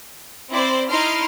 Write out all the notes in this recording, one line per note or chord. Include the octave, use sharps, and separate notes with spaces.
C4 E4 C5 D5
D#4 E4 C6 F6 C7 D7